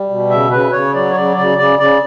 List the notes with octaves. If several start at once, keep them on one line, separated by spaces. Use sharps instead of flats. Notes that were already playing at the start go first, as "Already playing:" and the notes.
Already playing: G3
B2
C#3 E5
C#3 B4
C#3 C#5
F#3 D5
C#5
C#3 D5
C#3 D5
C#3 D5
C#3 D5